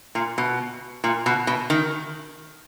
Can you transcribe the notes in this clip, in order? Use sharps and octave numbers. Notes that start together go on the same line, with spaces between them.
A#2
B2
A#2
B2
B2
D#3